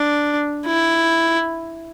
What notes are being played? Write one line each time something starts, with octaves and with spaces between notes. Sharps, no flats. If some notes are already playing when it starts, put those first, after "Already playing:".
Already playing: D4
E4